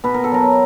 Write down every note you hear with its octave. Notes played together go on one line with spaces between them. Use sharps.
B2 B4
A#4
A4
F#3 A#4